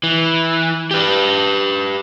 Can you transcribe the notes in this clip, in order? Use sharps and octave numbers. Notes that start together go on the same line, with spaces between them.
E3
G4 B4